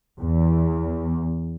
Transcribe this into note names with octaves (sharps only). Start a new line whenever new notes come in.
E2